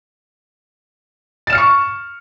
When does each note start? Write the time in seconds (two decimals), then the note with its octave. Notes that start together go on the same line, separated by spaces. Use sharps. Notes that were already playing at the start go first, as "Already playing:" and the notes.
1.47 A6
1.50 E7
1.52 F6
1.55 C#7
1.58 C#6